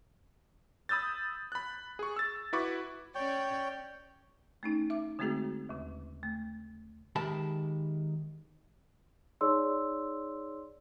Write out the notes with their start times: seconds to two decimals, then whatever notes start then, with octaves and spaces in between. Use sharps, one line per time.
0.89 B5 D#6 E6 G6 A6
1.52 B5 F#6
1.99 G#4 C#6
2.16 E6 A6
2.53 E4 F#4 B4 B5 C#6 D6
3.15 C#4 C#5 D5 G5
4.63 A3 C#4 D#4
4.90 E5 D6
5.19 D3 G#3 A3 C4 F#4 G#4
5.69 D#2 C#3
6.23 A3
7.16 D#3 G#3 G4 E5 A5 B5
9.41 D#4 G#4 C#5 D5 C6 E6